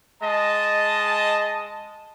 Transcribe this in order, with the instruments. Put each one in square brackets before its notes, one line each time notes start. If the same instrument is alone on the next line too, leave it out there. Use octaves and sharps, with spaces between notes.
[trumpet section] G#3 D#5 A5